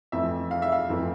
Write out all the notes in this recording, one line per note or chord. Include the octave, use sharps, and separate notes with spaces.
F2 E3 A3 C4 E5
F5
E5
F5
F2 E3 A3 C4